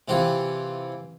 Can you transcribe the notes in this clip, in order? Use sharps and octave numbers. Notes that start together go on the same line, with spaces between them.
C3 E3 F4 G4